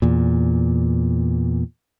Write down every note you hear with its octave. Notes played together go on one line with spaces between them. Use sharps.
E2 A#2